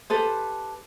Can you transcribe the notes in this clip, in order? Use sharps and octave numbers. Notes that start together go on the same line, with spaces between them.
G4 A4 B4 C5